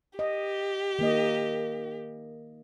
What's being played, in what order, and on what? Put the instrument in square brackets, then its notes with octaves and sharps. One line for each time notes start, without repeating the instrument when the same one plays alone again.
[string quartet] G4 [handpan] D#5
[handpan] D#3 A#3 D#5